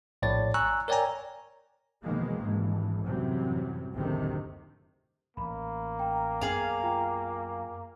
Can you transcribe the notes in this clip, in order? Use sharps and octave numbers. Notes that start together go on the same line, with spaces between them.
A#1 A2 C#5 D5 A6
G#5 A#5 C#6 E6 F#6
A#4 C#5 D5 G5 G#5 A#5
E2 B2 D#3 F3 G#3 A#3
G#1 G2 E3
F#2 A2 C3 E3 F#3 G3
F#1 D2 A2 C3 D#3
A1 A#3 B5
G5 A#5
F#2 B3 G#4 F5
F4 G5 A#5